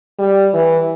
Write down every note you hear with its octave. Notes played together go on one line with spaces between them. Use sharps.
G3
E3